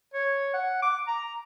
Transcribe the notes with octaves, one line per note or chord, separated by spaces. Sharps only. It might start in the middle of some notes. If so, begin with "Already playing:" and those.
C#5
F#5
D6
A#5